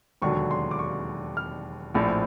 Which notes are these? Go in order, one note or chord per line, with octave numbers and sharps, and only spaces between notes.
E1 D#2 D3 F#3 C#6
C6
D6
C#6
F6
A#1 A2 F3